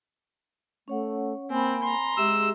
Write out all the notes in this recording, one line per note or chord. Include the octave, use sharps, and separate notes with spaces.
A3 C#4 C#5 F#5
A#3 C4 G#5 B5
A#5 C6
G#3 G4 G#4 E5 E6